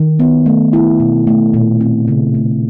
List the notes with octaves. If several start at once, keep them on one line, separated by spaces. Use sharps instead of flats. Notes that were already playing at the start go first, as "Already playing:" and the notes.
Already playing: D#3
B3
A3
E4
B2
A3
A#2
C4
C#3
A3